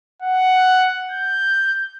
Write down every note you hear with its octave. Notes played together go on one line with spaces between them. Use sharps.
F#5
G6